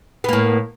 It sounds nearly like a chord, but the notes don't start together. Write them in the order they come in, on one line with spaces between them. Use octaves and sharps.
B3 A#3 A2